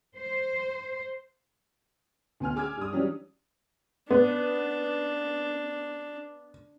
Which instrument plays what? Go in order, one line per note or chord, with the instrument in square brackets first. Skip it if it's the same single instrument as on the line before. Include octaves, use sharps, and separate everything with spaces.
[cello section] C5
[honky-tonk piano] D2 B3 G#5 F6
G#4 G#5 D6 E6 F6 G#6
G2 D#6
E3 F#3 G3 C#4 D4
[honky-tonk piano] B3 [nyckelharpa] D4